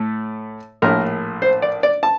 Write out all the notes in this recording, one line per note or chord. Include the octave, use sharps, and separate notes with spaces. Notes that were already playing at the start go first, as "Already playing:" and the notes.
Already playing: A2 A3
A#1 A2 A3 A#4
C5
D5
D5
A5